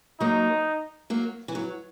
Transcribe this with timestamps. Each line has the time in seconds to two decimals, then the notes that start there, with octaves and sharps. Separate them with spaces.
0.20 F#3 A#3 D#4
1.10 F#3 A#3
1.48 E3
1.55 F#3